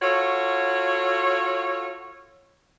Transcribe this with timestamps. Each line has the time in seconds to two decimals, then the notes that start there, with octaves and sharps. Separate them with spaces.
0.02 F4 F#4 A4 C#5